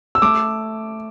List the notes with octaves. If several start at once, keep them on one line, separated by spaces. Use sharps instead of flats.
E6
A3 D6